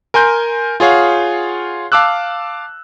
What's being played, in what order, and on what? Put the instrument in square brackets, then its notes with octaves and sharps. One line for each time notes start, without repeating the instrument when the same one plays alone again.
[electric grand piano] A#4 G#5 C6 G6
F4 G#4 C#5 F5 F#5
F5 A5 D6 E6 F#6